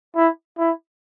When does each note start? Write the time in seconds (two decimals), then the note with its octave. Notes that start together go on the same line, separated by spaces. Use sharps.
0.15 E4
0.58 E4